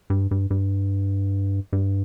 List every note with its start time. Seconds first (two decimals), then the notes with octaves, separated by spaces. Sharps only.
0.10 G2
0.31 G2
0.50 G2
1.73 G2